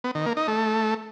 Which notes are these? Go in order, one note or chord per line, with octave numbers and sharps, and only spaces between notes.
B3
D#3
A#3
D#4
A3